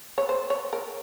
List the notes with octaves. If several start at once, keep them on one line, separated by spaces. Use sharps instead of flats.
C#5
C5
C#5
A#4